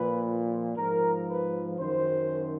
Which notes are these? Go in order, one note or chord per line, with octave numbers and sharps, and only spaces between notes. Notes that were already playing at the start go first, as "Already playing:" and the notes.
Already playing: A#2 F3 B4
G#2 F3 A#4
B4
F#2 D#3 C5